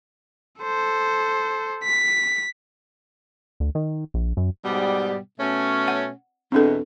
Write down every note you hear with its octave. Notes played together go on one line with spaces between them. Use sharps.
A4 C5
B6
D2
D#3
A#1
F#2
G#2 B2 G3
B2 A3 C#4
F#5
E2 B2 C4 D4 A4